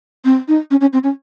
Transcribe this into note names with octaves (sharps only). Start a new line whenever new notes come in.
C4
D#4
C#4
C#4
C4
C#4